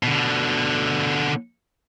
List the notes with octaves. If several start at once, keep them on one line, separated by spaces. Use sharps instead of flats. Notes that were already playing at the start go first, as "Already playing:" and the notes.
B2 D3